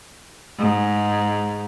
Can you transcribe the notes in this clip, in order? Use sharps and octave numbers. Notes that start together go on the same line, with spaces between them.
G#2